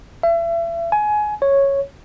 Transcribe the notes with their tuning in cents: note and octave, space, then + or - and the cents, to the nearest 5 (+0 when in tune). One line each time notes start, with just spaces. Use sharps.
E5 +35
G#5 +20
C#5 -5